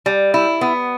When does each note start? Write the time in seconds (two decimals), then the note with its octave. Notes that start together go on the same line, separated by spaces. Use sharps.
0.06 G3
0.34 E4
0.61 B3